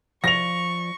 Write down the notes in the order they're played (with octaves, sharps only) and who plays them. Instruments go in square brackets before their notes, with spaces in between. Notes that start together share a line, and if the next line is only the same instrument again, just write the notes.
[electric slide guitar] F3 D5 [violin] C#6 [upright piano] A#6 F7